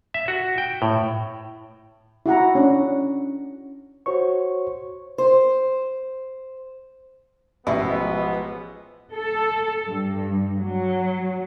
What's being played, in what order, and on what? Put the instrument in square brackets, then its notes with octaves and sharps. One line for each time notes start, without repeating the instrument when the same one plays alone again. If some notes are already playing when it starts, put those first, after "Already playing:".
[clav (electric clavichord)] E5
F#4
G5
A2
[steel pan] E4 F#4 F#5 A#5
C#4 D4
[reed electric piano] F#4 C5 C#5 C#6
[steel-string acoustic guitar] C5
[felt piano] A1 [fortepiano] B2 [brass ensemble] F3 G#3 B3 [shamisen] E4
[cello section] A4
G2
F#3